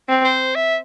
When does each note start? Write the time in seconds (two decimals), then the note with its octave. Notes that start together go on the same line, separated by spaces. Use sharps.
0.09 C4
0.24 C5
0.55 E5